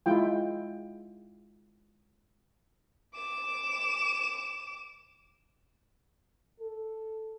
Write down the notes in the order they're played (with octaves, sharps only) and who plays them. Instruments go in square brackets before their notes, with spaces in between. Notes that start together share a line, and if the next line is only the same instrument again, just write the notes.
[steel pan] G#3 E4 F4 G5
[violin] D6 E7
[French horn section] A4